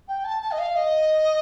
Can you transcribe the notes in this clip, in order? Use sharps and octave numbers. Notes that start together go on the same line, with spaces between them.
G5
A5
A5
D#5
F5
D#5